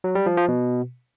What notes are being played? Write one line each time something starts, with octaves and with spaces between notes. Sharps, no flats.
F#3
G3
F3
F3
B2